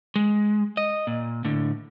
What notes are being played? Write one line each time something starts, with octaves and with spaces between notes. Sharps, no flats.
G#3
D#5
A#2
A2 D3